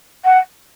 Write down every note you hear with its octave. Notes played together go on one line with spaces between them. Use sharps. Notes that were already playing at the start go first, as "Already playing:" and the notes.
F#5